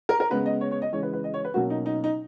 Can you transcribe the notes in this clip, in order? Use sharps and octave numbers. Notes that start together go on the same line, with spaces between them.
A#4
A#4
C#3 G#3 B3 B4
D#5
C#5
C#5
D#5
C#3 E3 G#3 C#5
B4
B4
D#5
C#5
B4
B2 F#3 A#3 C#4 F#4
D#4
D#4
D#4